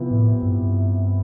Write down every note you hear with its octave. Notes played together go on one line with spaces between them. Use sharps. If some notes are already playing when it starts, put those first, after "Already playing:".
Already playing: C3 F3 B3 E4
A2
G2